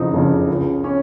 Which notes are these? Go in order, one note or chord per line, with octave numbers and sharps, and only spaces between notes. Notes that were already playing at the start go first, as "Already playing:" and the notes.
Already playing: F#1 F2 C#3 D#4
F#1 F2 C#3
C#2 C#3
C#4